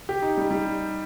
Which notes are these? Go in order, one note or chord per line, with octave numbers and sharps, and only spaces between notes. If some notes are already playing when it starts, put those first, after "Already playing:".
G4
D#4
G3
G3